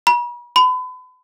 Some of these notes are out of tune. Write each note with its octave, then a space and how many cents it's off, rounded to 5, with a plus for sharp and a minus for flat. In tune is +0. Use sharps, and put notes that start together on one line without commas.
B5 -40
B5 +35